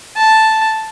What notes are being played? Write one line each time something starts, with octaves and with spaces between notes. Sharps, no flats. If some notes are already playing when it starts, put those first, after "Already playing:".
A5